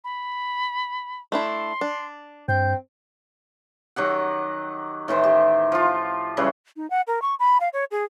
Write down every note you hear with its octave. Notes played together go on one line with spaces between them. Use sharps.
B5
A3 D4 E4 C6
D4
G2 C4 G6
D#3 F#3 G4 F#5
A2 D#3 E3 C5
G4
F3 F4
C#3 E3 F#3 G3
D#4
F#5
A#4
C#6
B5
F5
C#5
G#4